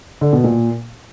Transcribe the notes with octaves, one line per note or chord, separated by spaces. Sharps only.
D3
B2
A#2